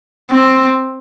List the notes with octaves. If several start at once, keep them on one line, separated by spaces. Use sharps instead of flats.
C4